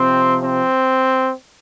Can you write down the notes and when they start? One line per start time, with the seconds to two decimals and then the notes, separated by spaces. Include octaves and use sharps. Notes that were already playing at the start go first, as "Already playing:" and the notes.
Already playing: C3 F3 C4
0.42 C4